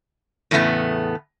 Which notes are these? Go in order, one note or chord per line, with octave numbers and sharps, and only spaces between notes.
E2 A2 C#3 A3 B3